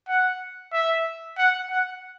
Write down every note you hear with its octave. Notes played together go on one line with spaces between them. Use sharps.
F#5
E5
F#5
F#5